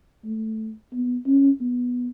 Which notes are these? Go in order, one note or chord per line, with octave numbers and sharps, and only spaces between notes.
A3
B3
C#4
B3